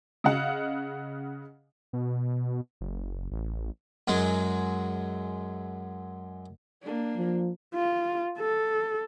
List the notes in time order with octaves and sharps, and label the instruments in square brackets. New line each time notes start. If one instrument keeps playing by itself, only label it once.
[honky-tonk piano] C#3 D#5 F5 F#5
[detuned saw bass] B2
F#1
A1
[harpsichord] F#2 F#3 G#3
[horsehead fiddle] A#3 D4
[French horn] F3
[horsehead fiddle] F4
A4